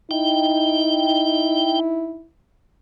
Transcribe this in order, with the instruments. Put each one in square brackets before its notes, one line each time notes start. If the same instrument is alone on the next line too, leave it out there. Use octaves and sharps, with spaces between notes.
[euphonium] D#4 [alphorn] E4 [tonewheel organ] G5